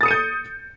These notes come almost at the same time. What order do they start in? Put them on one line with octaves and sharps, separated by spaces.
A6 D#6 C#7 D#7 G6